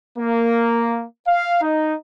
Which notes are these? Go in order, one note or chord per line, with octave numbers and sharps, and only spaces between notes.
A#3
F5
D#4